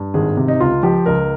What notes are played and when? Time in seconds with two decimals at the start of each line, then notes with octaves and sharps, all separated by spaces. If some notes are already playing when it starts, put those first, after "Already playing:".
Already playing: G2
0.14 G#1 G#4
0.37 C3
0.48 D#4
0.60 C#2 F4
0.83 F3 G4
1.06 C#2 A#4